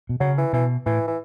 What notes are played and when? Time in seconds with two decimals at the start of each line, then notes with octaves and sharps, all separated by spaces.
0.09 B2
0.20 C#3 F#3
0.38 E3
0.53 B2 E3
0.86 A2 E3
1.07 E3